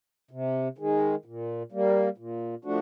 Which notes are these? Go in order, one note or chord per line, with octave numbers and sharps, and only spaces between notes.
C3
D#3 G#3
A#2
G3 A#3
A#2
F3 A3 D4 F#4